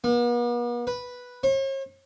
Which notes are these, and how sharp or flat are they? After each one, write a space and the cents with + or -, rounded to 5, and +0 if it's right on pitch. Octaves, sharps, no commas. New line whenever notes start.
B3 -45
B4 -5
C#5 -45